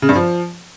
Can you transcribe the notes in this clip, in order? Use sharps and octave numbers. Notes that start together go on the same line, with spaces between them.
C#3
G2
F3